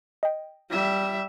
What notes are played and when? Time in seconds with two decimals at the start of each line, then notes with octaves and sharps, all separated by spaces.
0.23 D#5 G5
0.70 G3 E5